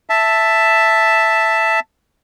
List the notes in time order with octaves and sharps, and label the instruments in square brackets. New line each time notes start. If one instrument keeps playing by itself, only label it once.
[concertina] E5 A5